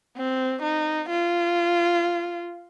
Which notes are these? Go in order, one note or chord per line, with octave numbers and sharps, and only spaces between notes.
C4
D#4
F4